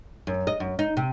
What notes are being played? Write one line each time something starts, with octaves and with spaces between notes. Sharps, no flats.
F#2
D#5
F#2
D#4
C3